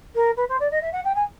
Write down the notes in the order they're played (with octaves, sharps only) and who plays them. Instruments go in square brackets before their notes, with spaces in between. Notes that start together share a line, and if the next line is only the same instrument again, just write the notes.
[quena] A#4
B4
C5
D5
D#5
E5
F#5
G5
G#5